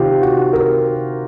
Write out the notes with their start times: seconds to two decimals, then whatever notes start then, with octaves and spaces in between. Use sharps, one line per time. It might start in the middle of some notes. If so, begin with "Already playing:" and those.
Already playing: C3 D#3 F4 G4
0.22 F#4
0.53 A#4